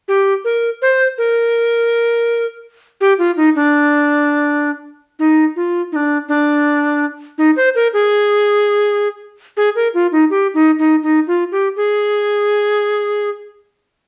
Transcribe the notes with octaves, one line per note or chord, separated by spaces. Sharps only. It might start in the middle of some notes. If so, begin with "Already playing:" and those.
G4
A#4
C5
A#4
G4
F4
D#4
D4
D#4
F4
D#4
D4
D4
D#4
C5
A#4
G#4
G#4
A#4
F4
D#4
G4
D#4
D#4
D#4
F4
G4
G#4